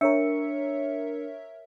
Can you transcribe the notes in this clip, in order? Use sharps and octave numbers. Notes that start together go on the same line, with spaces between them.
D4 A#4 C#5 E5 C#7